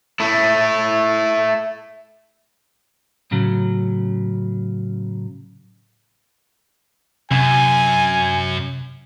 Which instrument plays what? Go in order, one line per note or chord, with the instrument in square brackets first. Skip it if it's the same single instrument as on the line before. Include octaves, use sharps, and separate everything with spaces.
[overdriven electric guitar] A3 E4
[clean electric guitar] A2 C#3 F#3
[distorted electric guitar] F#2 [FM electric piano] C3 [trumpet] G#5